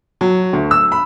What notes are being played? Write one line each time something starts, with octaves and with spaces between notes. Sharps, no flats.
F#3
D2
E6
B5